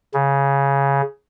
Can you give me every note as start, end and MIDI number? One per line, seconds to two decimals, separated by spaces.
0.14 1.02 49